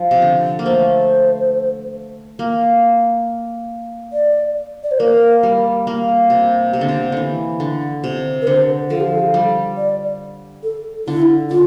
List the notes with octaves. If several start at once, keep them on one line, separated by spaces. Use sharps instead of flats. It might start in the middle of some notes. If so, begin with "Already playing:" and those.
Already playing: F3
C3
D3
A#3
A3 C5
A#3
D5
D5
C5
A#3 A#4
G3
A#3
C3
C3
D3
C3
D3 E3
D3
C3
A#4
D3 C5
F3 A4
G4
A4
G3
D5
A4
D3 E4
D3 F4